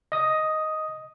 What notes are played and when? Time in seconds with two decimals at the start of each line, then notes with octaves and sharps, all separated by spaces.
0.12 D#5 D#6